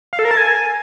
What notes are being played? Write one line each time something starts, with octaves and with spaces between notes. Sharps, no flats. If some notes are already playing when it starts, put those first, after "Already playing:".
F5
A4
A#4
A5
G#5